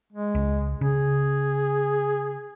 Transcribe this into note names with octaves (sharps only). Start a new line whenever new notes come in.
G#3
C#2
C#3 G#4